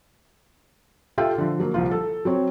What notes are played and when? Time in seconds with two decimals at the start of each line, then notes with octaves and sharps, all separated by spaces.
1.18 F4 G4 A4 E5 G5
1.38 D3 F3
1.60 F#3 A#3
1.74 C2 F3 F4
1.91 A4
2.25 F#3 C4 C#5